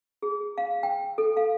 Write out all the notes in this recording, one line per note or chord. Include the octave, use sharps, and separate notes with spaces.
G#4
F5
G5
A4
F5